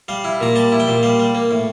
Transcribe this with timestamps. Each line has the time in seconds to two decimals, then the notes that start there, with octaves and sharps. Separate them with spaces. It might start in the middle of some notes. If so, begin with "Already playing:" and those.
0.08 G3 F5
0.24 E4
0.41 A#2 A#5
0.56 G3 A5
0.72 E4
0.80 G5
0.88 A#2
1.03 G3 F5
1.19 G3
1.35 A#3
1.51 A2